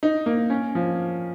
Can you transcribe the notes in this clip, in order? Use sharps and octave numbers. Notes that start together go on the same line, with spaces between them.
D#4
A#3
C#4
F3